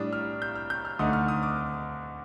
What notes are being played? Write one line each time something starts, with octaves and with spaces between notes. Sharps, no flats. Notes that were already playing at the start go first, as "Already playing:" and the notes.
Already playing: A2 G3 D4 D#6
F6
G6
F6
G6
F6
D2 D3 A3 D#4 D#6
F6
D#6
D6